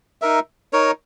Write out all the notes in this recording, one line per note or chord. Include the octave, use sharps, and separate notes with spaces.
D#4 A#4 E5
D#4 A#4 C#5